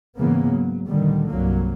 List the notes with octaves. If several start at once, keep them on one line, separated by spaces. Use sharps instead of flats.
E2 G#2 C#3 E3 A#3 B3
F#3
D2 A#2 D3 D#3 G3
C2 G2 F#3 A#3